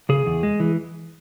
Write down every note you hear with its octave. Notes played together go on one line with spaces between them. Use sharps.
C#3 G#4
E2
G#3
E3